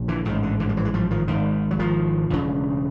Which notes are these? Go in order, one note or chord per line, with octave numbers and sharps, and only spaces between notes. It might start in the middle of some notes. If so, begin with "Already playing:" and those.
Already playing: A#1 A#2
D3 E3
A1 G#2 D#3
D3
D3 E3
G3
E3 F#3
G#3
F3 G3
D#3 F3
G#1 G#2 D#3
F#3
D#3 F3
E1 D2 C#3